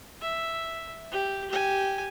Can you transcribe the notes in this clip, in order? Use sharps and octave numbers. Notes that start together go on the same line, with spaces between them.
E5
G4
G4 G#5